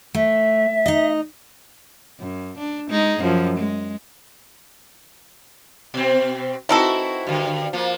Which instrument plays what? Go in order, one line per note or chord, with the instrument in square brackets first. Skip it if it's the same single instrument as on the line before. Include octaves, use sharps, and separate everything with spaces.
[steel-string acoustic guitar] A3 [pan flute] E5
[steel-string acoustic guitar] D#4 D#5
[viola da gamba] F#2
D4
G#3 D#4 G#4
F#2 F3
G#3
[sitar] B2 C4
[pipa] E3 D#4 A4 [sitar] C4 E4 F#4
[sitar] G2 D3
F3 A#3